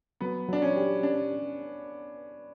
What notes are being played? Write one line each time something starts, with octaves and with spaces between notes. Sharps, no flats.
F#3 B3
F#3 D4
C#4
G4
C#4 D4